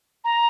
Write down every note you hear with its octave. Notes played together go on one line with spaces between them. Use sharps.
A#5